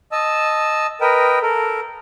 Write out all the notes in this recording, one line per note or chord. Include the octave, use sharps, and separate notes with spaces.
D#5 A5 E6
A#4 B4 D#5 G5
A4 A#4